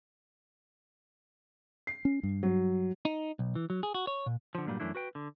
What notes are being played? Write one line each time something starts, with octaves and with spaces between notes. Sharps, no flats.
C7
C#4
G2
F#3
D#4
B1
E3
F#3
G#4
F#4
C#5
A#2
D3 F3
G2 A#2 F#3 G3
F#2 E3 A3 D4 E4
F#4 B4 G5
D3